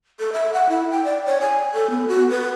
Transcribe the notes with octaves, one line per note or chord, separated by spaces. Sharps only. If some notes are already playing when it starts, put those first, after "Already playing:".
A4
E5
F#5
E4
G5
D5
C#5
G#5
A4
B3
F#4
B4